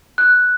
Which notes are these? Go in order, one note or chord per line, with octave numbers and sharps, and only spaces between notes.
F#6